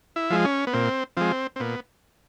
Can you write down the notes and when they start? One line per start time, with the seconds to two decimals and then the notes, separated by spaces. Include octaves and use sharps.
0.16 E4
0.30 F3 G#3
0.45 C#4
0.67 B3
0.73 A#2 C4
1.17 F3 G#3 C4
1.56 C4
1.60 A#2 B3